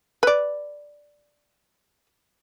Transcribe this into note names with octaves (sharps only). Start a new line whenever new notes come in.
B4 D5